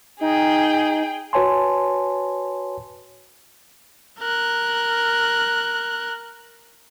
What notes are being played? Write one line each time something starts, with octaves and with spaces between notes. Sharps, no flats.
D#4 G#4 G5
F#4 B4 C#5 G#5 A5 C6
A#4 F#6